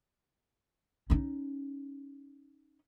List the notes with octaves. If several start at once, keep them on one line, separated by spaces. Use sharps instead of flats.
C#4 D#4